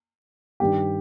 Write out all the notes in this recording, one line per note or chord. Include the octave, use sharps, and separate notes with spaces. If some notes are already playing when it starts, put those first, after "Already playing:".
G2 D#3 G3 G4